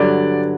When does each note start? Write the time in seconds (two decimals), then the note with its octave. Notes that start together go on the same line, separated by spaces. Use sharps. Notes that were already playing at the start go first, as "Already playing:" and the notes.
Already playing: G2 D3 F#3 D5